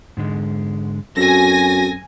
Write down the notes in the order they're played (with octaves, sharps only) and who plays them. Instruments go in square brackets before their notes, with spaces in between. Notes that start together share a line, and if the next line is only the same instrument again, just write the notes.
[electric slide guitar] G#2 D3 G#3
[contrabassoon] F#2 [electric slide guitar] C4 A4 [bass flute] F#4 [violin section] G#5 A#6